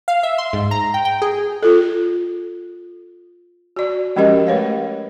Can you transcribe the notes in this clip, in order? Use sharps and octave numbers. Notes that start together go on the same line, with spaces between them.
F5
E5
C6
G#2
A#5
G5
G5
G#4
F4 A4
F#4 D5
F3 G#3 C#4 G4 A#4 D#5
A3 B4 C#5 F5